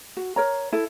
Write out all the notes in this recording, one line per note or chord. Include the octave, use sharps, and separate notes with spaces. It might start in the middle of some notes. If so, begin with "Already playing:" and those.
F#4
A#4 C#5 A#5
E4 A4